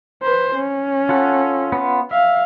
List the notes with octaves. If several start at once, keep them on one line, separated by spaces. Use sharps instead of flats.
B4 C5
C#4
F4 A4 F#5
B3 F4
E5 F5